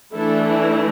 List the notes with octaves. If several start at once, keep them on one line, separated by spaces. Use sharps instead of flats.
E3 A3 D4 E4 A4
E4